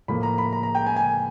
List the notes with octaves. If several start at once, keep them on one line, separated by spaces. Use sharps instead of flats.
A2 F3 A#3 B5
A#5
B5
A#5
A#5
G5
G#5
G#5